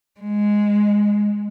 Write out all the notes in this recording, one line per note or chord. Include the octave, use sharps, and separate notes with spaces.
G#3